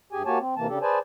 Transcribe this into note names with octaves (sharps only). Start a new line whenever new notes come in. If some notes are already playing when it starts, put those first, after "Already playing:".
G2 G4 G#4 G#5
A#3 F#4 G4 C#5 G#5 A5
C4
D#2 C3 E3 A#3 A5
C#3 D4 G4 A4
G#4 B4 C5 D5 G#5 A5